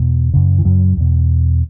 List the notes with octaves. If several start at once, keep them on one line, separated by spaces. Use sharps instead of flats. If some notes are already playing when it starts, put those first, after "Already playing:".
Already playing: E2 B2
F#2 C#3
E3
F#2 F#3
E2 B2